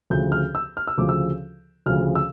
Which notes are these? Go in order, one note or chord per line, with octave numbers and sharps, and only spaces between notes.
D2 C#3 F3 G6
F6
E6
F6
E6
D2 C#3 F3 D6
E6
D2 C#3 F3 F6
E6